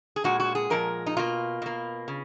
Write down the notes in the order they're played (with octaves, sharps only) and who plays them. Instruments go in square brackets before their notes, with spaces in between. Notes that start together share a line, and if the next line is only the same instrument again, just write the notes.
[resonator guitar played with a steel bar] G#4
A#2 G#3 F#4
F#4
G#4
A#2 F3 G#3 A#4
D#4
B2 A#3 F4
B2 A#3
C#3